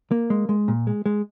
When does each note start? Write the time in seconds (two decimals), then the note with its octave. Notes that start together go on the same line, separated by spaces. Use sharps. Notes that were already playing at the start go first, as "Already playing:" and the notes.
0.11 A#3
0.30 G#3
0.49 G#3
0.68 A#2
0.87 G#3
1.06 G#3